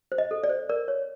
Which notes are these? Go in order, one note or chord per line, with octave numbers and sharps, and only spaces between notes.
C5
D#5
A4
D5
C5
A#4 D5
C#5